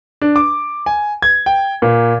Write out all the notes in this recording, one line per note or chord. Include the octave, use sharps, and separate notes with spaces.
D4
D6
G#5
G#6
G5
A#2